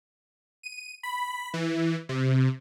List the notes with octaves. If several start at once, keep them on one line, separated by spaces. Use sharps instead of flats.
D#7
B5
E3
C3